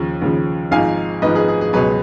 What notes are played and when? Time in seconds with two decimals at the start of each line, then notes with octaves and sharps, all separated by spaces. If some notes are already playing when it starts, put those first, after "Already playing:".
Already playing: D#2 C#3 F3
0.22 D#2 C#3 F3
0.71 G#1 G#2 F3 F5 G#5
1.22 G#1 G#2 F3 B4 D#5
1.35 G#4 B4
1.48 G#4
1.61 G#4
1.73 C#2 B2 F#3 G#4 B4